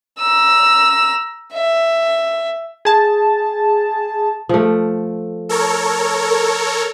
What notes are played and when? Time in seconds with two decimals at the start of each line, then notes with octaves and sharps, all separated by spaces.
0.19 A#5 E6
1.53 E5
2.85 G#4 A5
4.49 F3 A3
5.49 A4 A#4 C#5